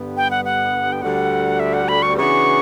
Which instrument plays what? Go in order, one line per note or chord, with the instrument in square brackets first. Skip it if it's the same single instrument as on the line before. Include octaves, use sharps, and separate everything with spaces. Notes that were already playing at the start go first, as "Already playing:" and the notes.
Already playing: [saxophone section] G2 D3 G3 B3
[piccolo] G5
F#5
F#5
G5
[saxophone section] D2 D3 G3 [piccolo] F#5
[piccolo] E5
F#5
B5
C#6
[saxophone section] C#3 E3 B3 D4 F#4 [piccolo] C#6